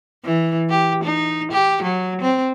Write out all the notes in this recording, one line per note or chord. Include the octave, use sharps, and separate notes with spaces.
E3
G4
D#4
G4
F#3
C4